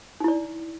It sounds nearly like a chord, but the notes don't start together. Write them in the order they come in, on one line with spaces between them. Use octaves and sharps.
D#4 E4 D5